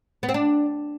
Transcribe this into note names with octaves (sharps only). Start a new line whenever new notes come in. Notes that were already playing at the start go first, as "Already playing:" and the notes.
B3
C4
D4